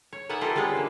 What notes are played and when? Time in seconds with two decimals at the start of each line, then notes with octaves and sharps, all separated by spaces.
0.13 C#5
0.29 A#3 B3 D#4 E5 F#5 G#5
0.41 E4 F4 G4 A4 A#4
0.55 G3 G#3 B3 C#4 F4
0.75 D3 E3 A#3